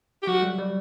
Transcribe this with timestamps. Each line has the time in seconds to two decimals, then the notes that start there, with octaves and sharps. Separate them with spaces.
0.22 G4
0.27 F#3 F#4
0.43 G3
0.59 G3